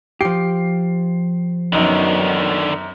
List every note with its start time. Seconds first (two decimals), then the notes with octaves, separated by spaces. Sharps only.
0.21 F3 G4 C7
1.73 F#2 D3 D#3 F#3 B3 D#4